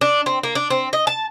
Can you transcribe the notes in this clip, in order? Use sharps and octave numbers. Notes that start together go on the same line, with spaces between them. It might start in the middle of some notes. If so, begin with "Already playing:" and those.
D4
C4
A#3
D4
C4
D#5
A5